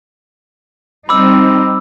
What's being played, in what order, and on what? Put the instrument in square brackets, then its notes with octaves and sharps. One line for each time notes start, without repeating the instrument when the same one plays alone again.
[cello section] G3 C4 D#4 [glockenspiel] B5 D6 E6